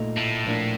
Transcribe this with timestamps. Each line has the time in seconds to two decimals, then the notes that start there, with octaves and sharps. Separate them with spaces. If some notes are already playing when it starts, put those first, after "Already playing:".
Already playing: A#2 A3 D#4
0.16 A2
0.47 A#2 F3 A#3 D4